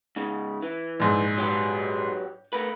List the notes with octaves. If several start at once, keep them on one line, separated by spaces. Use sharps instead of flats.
G#2 C#3
E3
A#1 G#2
F#3 G4 B4
A3 A#4 B4